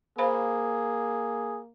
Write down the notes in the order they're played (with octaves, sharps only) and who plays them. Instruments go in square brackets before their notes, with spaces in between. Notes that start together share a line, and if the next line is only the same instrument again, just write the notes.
[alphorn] A#3 [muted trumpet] G#4 [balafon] C5 F5 B5